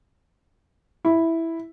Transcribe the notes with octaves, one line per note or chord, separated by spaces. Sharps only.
E4